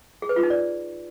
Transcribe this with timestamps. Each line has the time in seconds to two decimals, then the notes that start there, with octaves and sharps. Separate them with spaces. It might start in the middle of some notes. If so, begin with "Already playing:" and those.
0.22 G#4
0.29 B4
0.36 F4
0.43 D#4
0.50 D5